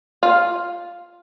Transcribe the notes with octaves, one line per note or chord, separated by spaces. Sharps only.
F4